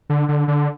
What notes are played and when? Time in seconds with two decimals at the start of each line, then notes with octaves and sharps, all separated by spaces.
0.09 D3
0.28 D3
0.48 D3